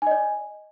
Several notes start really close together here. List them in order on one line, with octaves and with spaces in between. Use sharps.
G#5 D#5 D5